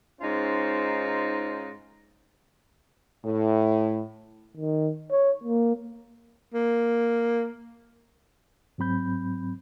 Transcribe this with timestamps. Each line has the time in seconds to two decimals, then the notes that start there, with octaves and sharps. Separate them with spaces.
0.21 G#2 C#4 D#4 F4 C5
3.24 A2
4.57 D#3
5.10 C#5
5.43 A#3
6.54 A#3
8.78 G#2 F#3 C4 B5 G6